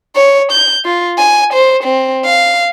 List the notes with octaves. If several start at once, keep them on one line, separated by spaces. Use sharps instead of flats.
C#5
G6
F4
G#5
C5
C4
F5